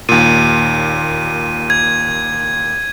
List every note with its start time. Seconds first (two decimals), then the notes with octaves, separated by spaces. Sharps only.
0.09 D#2 A#2 D#7
1.70 G#6